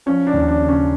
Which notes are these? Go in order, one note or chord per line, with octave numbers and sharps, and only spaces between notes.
F3 C#4
D4
D#2
D4
C#3
C#4